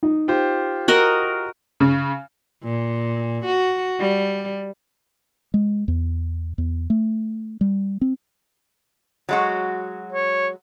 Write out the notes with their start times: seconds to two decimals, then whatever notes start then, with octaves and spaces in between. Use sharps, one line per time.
0.03 D#4
0.28 F4 G4 C5
0.88 F#4 A#4 D#5
1.80 C#3
2.63 A#2
3.45 F#4
3.99 G3
5.54 G#3
5.88 E2
6.58 E2
6.90 A3
7.61 G3
8.01 C4
9.29 F#3 G#3 F#4
10.12 C#5